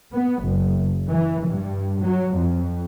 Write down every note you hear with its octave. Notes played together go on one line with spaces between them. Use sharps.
B3
F#1
E3
G2
F#3
F2